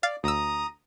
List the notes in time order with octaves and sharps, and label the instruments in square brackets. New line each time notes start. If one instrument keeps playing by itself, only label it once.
[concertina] D5 [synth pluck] F5 F6 A6
[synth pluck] D2 E6 [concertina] A#5 D#6